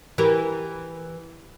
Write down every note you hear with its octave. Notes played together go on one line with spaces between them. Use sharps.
E3 G4 A#4